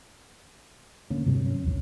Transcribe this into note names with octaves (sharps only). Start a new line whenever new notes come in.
D3 A#3 C#4
G2 C3 F#3
C#4
B1 E2